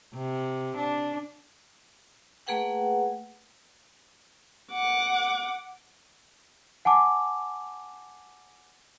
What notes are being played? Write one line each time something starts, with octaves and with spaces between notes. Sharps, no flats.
C3
D4
A3 A#3 G#4 B4 F#5 G5
F#5 D6
F#5 G#5 A5 D6